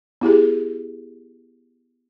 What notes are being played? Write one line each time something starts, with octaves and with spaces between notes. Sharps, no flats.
B3 E4 G4 G#4